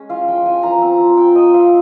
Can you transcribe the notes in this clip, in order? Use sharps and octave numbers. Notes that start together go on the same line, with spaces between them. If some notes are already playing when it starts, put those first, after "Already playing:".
Already playing: G#3 C#4
F4 F5
F3 G5
F4 G#5
F3 A#5
C4
F3
C4 G5
C4 D#5
C4 F5